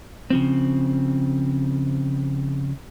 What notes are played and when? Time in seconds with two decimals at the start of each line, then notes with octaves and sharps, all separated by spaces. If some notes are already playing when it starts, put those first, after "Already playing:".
0.30 C#3 F3 C4